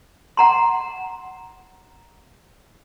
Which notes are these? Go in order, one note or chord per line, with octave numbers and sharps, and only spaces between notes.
F#5 A#5 C6